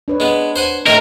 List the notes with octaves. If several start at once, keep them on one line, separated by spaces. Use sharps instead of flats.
D4 B4 C#5
G#3 B3
C5 F#5 G#5
A2 D#3 D#4 A#4